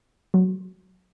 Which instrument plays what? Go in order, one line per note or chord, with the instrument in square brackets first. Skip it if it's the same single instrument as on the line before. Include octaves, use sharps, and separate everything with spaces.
[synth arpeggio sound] F#3